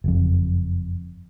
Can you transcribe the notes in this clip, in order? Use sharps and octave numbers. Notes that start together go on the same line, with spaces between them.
F#1 F2